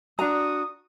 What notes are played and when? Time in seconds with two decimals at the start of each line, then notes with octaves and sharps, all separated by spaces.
0.19 D4 F#4 A#5 D#6